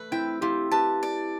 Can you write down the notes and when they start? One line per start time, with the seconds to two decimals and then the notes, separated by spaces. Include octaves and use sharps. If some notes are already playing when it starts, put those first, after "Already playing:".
Already playing: A3 B4
0.11 C4 E4 G5
0.41 E4 F4 G4
0.71 G4 B4 A5
1.03 D5